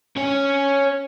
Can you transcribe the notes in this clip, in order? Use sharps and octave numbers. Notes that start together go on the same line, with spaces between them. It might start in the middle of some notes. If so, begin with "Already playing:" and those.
C#4 C#5